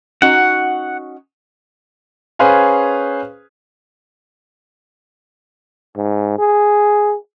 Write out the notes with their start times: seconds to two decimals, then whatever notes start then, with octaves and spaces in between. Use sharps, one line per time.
0.22 C#4 D#4 F#4 F#5
2.39 C#4 G#4 B4 C5 F5 G#5
5.96 G#2
6.39 G#4